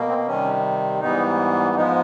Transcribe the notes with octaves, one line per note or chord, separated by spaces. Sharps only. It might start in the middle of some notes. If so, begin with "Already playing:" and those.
Already playing: B2 A#3
C4
C3 D#3 G3 C#4
G#2 E3 G3 B3 D#4
G#2 F3 G#3 B3 D#4